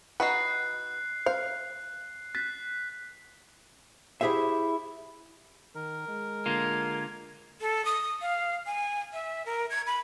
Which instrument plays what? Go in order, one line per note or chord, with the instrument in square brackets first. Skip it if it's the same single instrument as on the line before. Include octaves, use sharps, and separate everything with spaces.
[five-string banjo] D#4 F#4 B4 [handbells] F#5 [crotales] F#6 C7
[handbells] C5 [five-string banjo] F5
[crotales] F#6 B6 [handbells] A6
[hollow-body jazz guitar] E4 G4 G#4 C5 E5
[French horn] D#3 [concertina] A#4
[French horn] G#3
[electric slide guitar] D3 A#3 F4 [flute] G#6
[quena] A4
D#6
F5
G#5
E5
A#4
G#6
B5